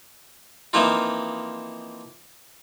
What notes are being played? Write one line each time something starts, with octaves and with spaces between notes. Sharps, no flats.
E3 F3 A#3 C4 D#4 F4